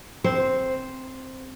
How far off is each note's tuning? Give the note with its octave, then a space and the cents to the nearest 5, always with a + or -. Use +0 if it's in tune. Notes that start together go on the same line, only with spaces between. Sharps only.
C4 +0 C5 +0